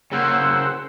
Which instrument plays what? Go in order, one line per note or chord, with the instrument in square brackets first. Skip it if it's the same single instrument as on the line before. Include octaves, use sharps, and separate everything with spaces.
[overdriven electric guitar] C#3 A#3 [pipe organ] C5 F#5 E6